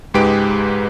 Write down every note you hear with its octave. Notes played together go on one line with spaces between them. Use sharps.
C#2 G#2 G#3 G4 B4 D7